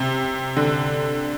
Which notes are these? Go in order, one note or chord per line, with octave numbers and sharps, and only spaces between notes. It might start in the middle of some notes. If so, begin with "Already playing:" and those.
Already playing: C3
D3